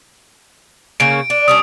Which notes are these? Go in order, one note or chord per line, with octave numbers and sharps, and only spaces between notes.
C#3 A#3 C#4 D7
D4
G3 C#4 D4 D#6